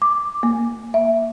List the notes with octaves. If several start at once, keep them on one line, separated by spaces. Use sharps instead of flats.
D6
A#3
E5